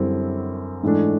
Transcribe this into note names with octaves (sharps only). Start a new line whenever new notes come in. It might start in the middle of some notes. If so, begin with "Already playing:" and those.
Already playing: F#2 D3 G3 C4 E4
G#2 E3 A3 D4